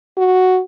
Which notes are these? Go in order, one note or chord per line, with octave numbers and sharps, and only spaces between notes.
F#4